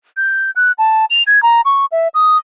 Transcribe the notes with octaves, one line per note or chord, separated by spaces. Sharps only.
G6
F#6
A5
F7
G#6
A#5
C#6
E5
D#6